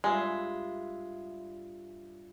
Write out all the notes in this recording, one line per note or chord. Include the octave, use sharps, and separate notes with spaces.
G2 G#3 F4 E5